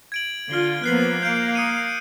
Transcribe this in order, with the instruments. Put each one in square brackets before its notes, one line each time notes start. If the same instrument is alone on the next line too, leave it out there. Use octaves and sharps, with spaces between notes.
[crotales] G#6 D7 F#7
[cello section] D3 F4 [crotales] F6 G7
[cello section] F3 A#3 B3 [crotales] F#6 C7 F#7
[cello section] A#3 F5 [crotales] G6 D7
[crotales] D#6 C#7 D#7